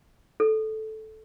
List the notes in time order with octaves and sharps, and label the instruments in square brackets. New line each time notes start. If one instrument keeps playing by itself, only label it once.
[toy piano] A4